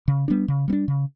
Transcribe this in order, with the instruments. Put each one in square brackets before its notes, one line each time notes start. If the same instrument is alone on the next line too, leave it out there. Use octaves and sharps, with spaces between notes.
[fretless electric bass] C#3
G3 B3 D4
C#3
G3 B3
D4
C#3